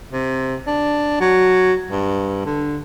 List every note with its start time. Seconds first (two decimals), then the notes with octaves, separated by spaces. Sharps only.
0.11 C3
0.67 D4
1.21 F#3
1.90 G2
2.45 D3